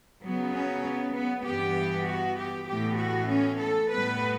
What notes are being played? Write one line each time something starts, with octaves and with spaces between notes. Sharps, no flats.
C#3 F#3 B3
C#4
B3
B3
G2 E3 B3 G4
F#4
G4
A2 E3 B3 G4
F#4
C#4
A4
A2 G3 B3 B4